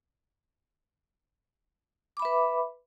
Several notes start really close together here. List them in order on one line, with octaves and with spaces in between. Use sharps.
D6 B5 E5 B4